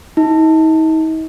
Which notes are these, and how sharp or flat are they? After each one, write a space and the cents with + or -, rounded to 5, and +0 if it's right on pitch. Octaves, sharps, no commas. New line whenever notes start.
D#4 +40